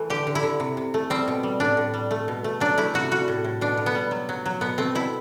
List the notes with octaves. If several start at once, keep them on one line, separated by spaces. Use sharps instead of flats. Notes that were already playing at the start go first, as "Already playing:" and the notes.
Already playing: E3 A3
D3 G4
D3
E4
D3
C3
C3
A3
G3 C4
B2
G3
A2 D4
A2
G3
A3
B2
A3
F#3 D4
A3 E4
C3 F#4
G3 F#4
A2
A2
B2 D4
B2
B3
G3
F#3
F#3
F#3
B2 B3
A3 C4
B2 E4